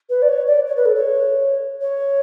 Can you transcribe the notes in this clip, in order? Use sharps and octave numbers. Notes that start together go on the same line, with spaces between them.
B4
D5
C#5
D5
C#5
B4
A4
C#5
C#5